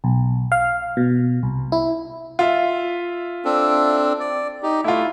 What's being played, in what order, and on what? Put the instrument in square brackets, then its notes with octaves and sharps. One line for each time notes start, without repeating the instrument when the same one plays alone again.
[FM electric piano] B1
F5
B2
C2
E4
[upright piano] F4 E5
[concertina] C4 D4 A4
D5
D#4 G4
[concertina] A3 [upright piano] E4 F4